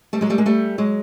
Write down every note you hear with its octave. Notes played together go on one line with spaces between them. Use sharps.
G3 A3
F#3 G#3
G3 A3
G#3 A#3
G3 A3
F#3 G#3